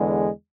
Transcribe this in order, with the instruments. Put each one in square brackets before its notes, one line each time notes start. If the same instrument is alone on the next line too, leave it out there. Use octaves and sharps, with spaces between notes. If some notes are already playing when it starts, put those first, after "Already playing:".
Already playing: [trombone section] E2 D3 G#3